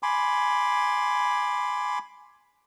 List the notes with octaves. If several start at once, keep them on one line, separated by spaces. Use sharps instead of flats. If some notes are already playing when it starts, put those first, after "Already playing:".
G#5 B5 C6 D6